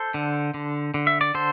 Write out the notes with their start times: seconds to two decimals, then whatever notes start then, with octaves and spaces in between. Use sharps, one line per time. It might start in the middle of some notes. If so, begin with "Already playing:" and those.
Already playing: A4 C5
0.14 D3
0.54 D3
0.94 D3
1.07 E5
1.21 D5
1.35 D3 A4 C5